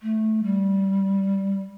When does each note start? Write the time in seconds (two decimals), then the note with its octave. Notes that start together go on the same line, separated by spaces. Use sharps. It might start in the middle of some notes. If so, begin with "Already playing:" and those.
0.02 A3
0.43 G3